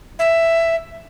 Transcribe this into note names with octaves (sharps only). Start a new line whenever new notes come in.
E5